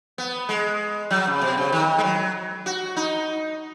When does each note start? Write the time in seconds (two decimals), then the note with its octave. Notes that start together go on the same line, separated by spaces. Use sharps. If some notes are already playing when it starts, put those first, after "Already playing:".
0.18 B3
0.49 G#3
1.11 F#3
1.27 C#3
1.42 B2
1.57 C#3
1.72 D#3
1.98 G#3
2.03 F#3
2.66 F#4
2.97 D#4